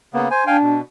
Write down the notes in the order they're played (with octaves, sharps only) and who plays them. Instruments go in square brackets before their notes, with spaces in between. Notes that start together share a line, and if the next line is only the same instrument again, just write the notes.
[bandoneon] C#3 A#3 B3
C5 G#5
[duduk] D4 [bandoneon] F5 G5 G#5
[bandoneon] B2